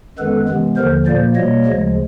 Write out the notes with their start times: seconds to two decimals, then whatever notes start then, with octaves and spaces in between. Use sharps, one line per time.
0.19 F#2 D#3 G#3 B3 A4 B4
0.48 C3 E3 G#3 B3
0.77 D#2 D3 F3 A#4 C5
1.06 A#2 F3 A#3 C5 D5
1.35 B2 G3 A#3 C#5 D#5
1.65 D2 C#3 F3 G#3